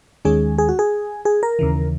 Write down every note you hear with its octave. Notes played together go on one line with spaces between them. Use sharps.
D#2 D#3 G#3 C#4 G#4
G#4
F#4
G#4
G#4
A#4
D#2 C#3 E3